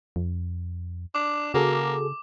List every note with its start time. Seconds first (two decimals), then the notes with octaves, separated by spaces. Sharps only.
0.16 F2
1.15 D4 D6
1.54 C#3 A#3 F#4 G#4 A4